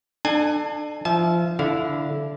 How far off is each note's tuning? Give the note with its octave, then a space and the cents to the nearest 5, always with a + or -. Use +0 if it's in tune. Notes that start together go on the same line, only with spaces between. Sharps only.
D4 +35 A4 +0 G#5 +0
F3 -20 E5 +0 A5 -40
D3 -15 E4 +0 F5 +10